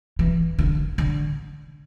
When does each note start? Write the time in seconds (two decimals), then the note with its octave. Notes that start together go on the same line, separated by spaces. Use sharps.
0.19 E3
0.59 D3
0.98 D3